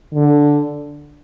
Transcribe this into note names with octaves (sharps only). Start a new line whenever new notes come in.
D3